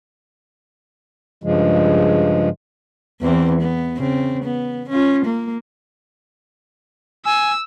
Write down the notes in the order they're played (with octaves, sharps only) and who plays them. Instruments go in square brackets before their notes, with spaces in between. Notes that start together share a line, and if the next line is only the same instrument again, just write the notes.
[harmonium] G2 C#3 F3 G#3
[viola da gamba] E2 E3 C4
B3
C#3 C4
B3
C#4 F4
A#3
[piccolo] G#5 [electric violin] E6